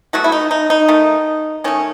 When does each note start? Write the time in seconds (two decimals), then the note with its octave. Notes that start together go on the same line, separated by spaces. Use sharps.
0.13 B2 F#3 A3 F#4
0.24 E4
0.32 D#4
0.51 D#4
0.70 D#4
0.88 D#3 A3
1.64 D#3 A3 C#4